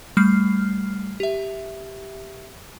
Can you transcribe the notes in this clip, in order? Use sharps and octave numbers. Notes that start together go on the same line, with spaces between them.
G3 A3 F6 C7
G4 E5